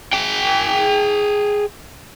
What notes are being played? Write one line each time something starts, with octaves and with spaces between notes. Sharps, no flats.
G#4 G5